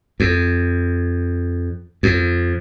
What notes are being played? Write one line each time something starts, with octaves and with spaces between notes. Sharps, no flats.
F2
F2